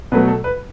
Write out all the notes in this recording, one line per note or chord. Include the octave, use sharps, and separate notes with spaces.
B2 F#3 A3 B4
A4
B4